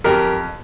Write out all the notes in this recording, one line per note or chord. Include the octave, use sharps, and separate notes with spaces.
F2 G4 A#4